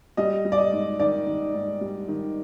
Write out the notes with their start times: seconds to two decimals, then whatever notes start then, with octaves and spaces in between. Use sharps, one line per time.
0.17 G3 D#5
0.45 G3
0.52 D5
0.58 D#5
0.72 G#2
1.00 D#3 D5
1.26 D#3
1.54 G#2
1.81 G3
2.08 D#3